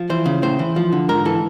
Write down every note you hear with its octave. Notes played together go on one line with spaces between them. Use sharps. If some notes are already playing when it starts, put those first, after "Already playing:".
Already playing: F3
E3 C5
C#3
A2 C5
E3
F3
D3
G#2 A#4
E3 A4